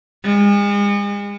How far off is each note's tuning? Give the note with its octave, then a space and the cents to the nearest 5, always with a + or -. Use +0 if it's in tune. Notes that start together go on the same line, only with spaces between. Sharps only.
G#3 -40